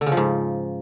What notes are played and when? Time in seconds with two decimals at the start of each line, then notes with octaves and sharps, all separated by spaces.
0.01 D3
0.06 C#3
0.12 F3
0.17 G#2